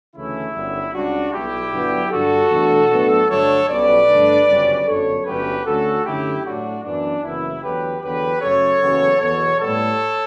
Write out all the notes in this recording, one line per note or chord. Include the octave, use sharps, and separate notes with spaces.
D2 C#3 E3 A3 C#4 E4
G1 F#2 D3 G3
C#2 C#3 G3 D4 F#4
B1 B2 G3 E4 G4
G1 G2 F#3 B3 D4
G2 D3 G3 F#4 A4
E2 B2 A3 D4
A2 F#3 B3 D4
G2 D3 F#3 A3 D4 A4 C#5
B1 B2 G3 C#4 B4 D5
G2 D3 A3 D4
G1 F#2 C#3 G3 C#4
G1 F#2 D3 A4 C#5
G1 G2 F#3 A3 C#4 G4 B4
D2 D3 A3 C#4 F#4 A4
F#2 D3 A3 C#4 E4 G4
A2 F#3 A3 D4 F#4
F#2 E3 B3 D4
F#1 F#2 E3 B3 E4
E2 D3 F#3 A3 G4 B4
E2 D3 F#3 B3 G4 B4
F#2 C#3 F#3 A3 A4 C#5
F#1 E2 C#3 F#3 B3
E2 B2 F#3 A4 C#5
A2 G3 B3 A4 C#5